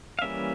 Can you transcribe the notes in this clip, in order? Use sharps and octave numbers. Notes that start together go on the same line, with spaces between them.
F5
E3 G3 A#3 C#4 E5